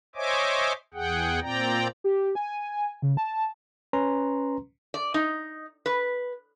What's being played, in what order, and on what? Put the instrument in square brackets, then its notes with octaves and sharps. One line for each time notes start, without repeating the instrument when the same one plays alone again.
[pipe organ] C5 C#5 D#5 E5 G#5 D6
E2 G#4 F#5 G5
A#2 C4 D5 G5 A#5
[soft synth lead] G4
G#5
C#3
A5
[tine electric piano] C#4 B4 A#5 C6
[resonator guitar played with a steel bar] D5
D#4
B4